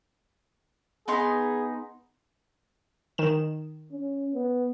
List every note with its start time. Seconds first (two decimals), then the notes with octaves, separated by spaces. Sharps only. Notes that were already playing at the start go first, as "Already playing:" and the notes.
1.08 B3 D#4 G#4 C6
3.18 D#3 E7
3.92 C#4
4.34 B3